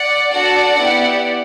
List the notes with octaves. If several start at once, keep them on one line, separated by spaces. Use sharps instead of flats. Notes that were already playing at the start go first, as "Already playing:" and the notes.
Already playing: D5 F#5
D4 F#4 A4 D5 F#5
B3 E4 G4